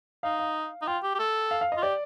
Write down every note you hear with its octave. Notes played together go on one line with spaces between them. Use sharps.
D#4 F5
F5
D#4
F4 G5
G4
G4
A4
F5
F5
F4 D#5
G4 D5